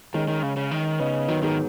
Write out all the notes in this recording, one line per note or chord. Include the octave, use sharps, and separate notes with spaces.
D#3 G#3 C#4
D#3
C#3
C#3
D#3
C#3 B3 D#4
D#3 F#3 B3
G#2 D#3